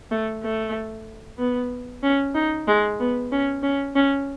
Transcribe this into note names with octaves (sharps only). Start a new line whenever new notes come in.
A3
A3
B3
C#4
D#4
G#3
B3
C#4
C#4
C#4